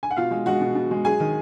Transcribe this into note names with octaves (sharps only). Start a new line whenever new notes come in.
G#5
F#5
B2 F4 F5
G#3
G#3 F#4 F#5
B2
B2
G#3
F#3 G#4 G#5
D#3